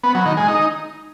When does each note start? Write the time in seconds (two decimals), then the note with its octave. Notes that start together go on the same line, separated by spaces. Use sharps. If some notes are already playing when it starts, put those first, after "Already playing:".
0.04 B3
0.15 F#3
0.26 D#3
0.37 G#3
0.48 D#4